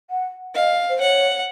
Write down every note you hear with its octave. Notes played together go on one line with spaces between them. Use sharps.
F#5
D#5 F5
C5
C#5 F#5